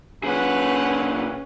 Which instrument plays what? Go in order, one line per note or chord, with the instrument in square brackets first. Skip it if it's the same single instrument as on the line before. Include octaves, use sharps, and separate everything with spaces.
[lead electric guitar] A#2 G#4 [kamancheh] C#4 [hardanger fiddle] B4 F#5